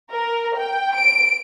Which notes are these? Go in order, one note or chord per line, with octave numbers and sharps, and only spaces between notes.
A#4
G5
D7